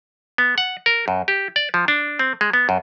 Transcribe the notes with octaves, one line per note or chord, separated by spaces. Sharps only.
B3
F#5
A#4
F#2
G4
D5
F3
D4
C4
G#3
B3
F#2